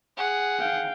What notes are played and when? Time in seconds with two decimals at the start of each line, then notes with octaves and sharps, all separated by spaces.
0.17 G#4 F#5
0.60 F5 G5